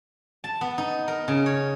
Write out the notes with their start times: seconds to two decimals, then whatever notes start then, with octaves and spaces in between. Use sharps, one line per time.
0.44 A5
0.61 B3
0.78 D#4
1.08 A#4
1.28 C#3
1.46 C#5